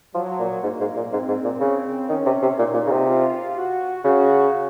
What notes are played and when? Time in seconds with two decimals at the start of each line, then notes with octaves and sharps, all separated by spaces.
0.15 F3 F#3
0.40 A#2
0.63 G#2 A#3
0.80 G#2
0.96 A#2
1.12 G#2 C4
1.29 G#2
1.44 A#2
1.61 C#3
2.09 D#3 C#4
2.26 C3
2.42 C3
2.58 A#2 D#4
2.74 A#2
2.86 C#3
2.91 C3
3.07 F4
3.56 F#4
4.04 C#3 F#4